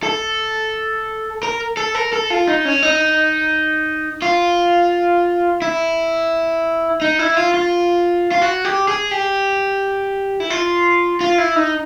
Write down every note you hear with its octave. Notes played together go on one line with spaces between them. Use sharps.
A4
A#4
A4
A#4
A4
F4
D#4
C#4
D#4
F4
E4
D#4
E4
F4
F4
F4
F#4
G4
G#4
G4
E4
F4
F4
E4
D#4